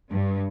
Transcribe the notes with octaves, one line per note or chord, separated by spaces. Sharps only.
G2